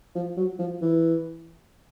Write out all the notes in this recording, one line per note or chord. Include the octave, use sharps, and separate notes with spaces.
F3
F#3
F3
E3